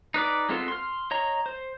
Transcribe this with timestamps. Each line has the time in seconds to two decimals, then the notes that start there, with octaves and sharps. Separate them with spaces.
0.14 D#4 B4 D5 D6
0.49 G#3 B3 C4 F4 A4
0.68 C6 F6
1.11 C#5 D#5 A#5
1.46 C5